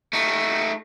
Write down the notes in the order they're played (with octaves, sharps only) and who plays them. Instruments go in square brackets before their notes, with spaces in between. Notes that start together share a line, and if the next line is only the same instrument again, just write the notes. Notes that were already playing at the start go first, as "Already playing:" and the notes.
[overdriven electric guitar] A3 D#4